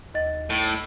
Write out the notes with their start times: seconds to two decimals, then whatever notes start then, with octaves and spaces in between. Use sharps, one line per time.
0.14 D#2 D#5 A6
0.50 A2